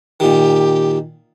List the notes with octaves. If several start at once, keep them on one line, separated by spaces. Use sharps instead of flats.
A#2 D#3 G4